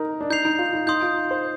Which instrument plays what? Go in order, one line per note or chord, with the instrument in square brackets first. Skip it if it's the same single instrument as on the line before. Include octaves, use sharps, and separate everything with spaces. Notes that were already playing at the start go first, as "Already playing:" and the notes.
Already playing: [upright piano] D#4 A#4
D4
[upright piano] D#4 [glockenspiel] G6 C7 F7
[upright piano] D#4
F4
D#4
[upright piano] D#4 [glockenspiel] C6 D#6 G6
[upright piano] F4
C5